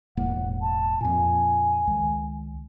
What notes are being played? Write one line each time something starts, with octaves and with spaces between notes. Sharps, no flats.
E1 A2 A#3 F#5
A5
F2 A#2 G#5
C#2 D#3